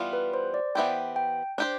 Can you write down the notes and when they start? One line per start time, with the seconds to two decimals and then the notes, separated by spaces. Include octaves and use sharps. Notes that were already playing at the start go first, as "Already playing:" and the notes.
Already playing: E3 G3 B3 F4
0.13 B4
0.34 C5
0.54 D5
0.75 E3 B3 E4 G4 C5 G5
1.16 G5
1.58 D4 G4 C5